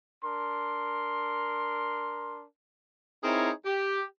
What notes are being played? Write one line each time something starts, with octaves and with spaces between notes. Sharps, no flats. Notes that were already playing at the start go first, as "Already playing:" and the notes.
D4 A#4 C6
C4 D#4 E4 G#4 A#4 C#5
G4